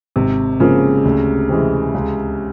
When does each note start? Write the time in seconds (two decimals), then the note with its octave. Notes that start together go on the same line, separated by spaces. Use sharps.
0.16 G#1 C3
0.60 G#2 C#3 F3 A#3
1.05 D2
1.49 C3 E3 G#3
1.94 C#2